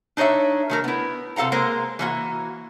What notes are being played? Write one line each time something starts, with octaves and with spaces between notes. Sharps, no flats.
D4 D#4 C#5 D5 E5
D#3 A3 A#4
B3 E4
C3 A4 F5 F#5 A#5
G#3 A#3 A#4 C5
E3 A#3 F#4